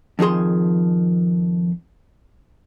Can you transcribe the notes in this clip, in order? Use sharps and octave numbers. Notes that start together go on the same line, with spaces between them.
F2 D#3 F3 G#4 C6